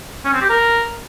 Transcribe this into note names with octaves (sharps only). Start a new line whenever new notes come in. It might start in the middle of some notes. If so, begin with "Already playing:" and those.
C#4
C4
G4
A#4